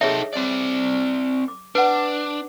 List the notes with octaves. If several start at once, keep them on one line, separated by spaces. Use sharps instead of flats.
D#4 G#4 A4 C#5 E5
C4 D5
D6
D4 B4 F#5